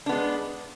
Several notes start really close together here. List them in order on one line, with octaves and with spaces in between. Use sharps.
D4 B3 G#3